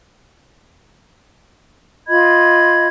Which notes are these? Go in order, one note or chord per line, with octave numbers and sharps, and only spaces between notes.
F4 D#5 B5 G#6